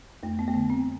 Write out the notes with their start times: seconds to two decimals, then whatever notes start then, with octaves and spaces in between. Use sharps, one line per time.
0.23 F2 A3
0.39 B3
0.48 A3
0.54 D3 B3
0.70 C4